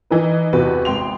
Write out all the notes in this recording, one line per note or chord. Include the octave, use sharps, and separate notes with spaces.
E3 D#4 B4
E2 C3 F#4 B4
G#1 G5 C6 F7